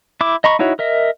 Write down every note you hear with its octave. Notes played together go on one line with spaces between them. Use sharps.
E4 D6
D#5 A#5 B5 C#6
D#4 E4 F#4 C#5
A#4 D#5 E5